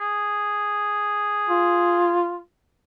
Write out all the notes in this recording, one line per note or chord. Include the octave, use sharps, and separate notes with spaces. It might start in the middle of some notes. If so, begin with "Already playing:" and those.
G#4
F4